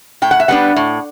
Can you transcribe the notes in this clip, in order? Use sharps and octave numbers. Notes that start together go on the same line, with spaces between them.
A2 G5
F#5
E5
G3 B3 D4 F#5
A2